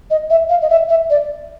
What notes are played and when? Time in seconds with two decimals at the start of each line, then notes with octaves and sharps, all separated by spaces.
0.10 D#5
0.30 E5
0.50 F5
0.62 D#5
0.70 E5
0.89 E5
1.10 D5